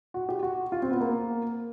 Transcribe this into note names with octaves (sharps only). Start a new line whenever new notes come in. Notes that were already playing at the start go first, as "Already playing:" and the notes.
F#4
G4
F#4
F4
C4
B3
A#3